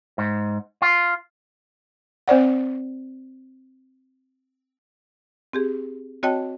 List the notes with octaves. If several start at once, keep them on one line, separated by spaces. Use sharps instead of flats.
G#2
F4
C4 C5 D5 F#5
C4 G4 G#4
C4 F#4 C#5 D#5 G5 A5